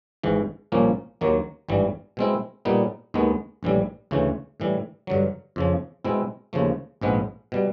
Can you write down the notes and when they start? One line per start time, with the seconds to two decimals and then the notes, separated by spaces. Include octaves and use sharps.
0.23 G#1 G#2 E3
0.72 C2 A#2 F3 A#3 C#4
1.21 D#2 D#3 F#3 A#3
1.69 G#1 G2 E3 G3
2.17 B2 G#3 C4 E4
2.65 A#2 G3 B3 D#4
3.14 D#2 D#3 G#3 B3
3.63 A#1 A2 E3 G3
4.11 D2 C#3 E3 A3
4.60 A2 E3 G3
5.07 G2 D3 F#3
5.56 F2 C#3 F3
6.05 B2 G#3 C4 E4
6.53 D#2 C#3 F3 A3
7.01 A#1 G#2 F3 G#3 B3
7.52 B2 G3